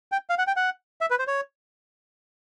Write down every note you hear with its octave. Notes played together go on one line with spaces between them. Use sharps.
G5
F5
F#5
G5
F#5
E5
B4
C5
C#5